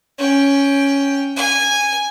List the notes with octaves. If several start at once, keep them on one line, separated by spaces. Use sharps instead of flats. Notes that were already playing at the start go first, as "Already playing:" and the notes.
C#4 G5
G#5